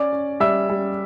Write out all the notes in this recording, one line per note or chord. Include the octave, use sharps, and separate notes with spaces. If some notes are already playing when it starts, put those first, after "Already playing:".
Already playing: C#4 D5 D6
C#4
G3 E5 E6
G3